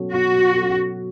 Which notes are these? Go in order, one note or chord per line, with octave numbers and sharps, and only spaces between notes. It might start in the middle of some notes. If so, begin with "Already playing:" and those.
Already playing: B2 F#3 C#4 A4
B2 F#4
F#3 C#4 A4